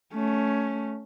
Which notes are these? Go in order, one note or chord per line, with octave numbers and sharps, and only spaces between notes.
A3 C#4